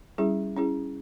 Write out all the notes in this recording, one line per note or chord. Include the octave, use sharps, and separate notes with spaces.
G3 C#4 E4 G#4
C#4 E4 G#4